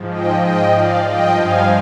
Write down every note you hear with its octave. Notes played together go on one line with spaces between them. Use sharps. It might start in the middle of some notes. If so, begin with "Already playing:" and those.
Already playing: G#2 F3
D#5 G5
D#5 G5
D5 F5
G2 F3 D#5 G5
F5 G#5